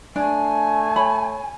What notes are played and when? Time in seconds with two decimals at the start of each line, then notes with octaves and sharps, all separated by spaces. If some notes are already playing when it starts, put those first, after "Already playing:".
0.16 A3 D4 G#5
0.96 C#5 B5